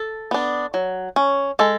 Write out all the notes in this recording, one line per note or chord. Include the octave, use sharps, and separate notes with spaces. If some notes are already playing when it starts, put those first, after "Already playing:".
Already playing: A4
B3 D4
F#3
C#4
G#3 A4